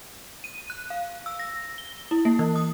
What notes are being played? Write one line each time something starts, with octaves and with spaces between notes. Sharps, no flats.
D#7
F#6
F5
E6
A#6
G7
E4
A#3
E3
D#6